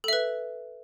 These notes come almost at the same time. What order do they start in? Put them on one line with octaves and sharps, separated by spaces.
A4 E5 B4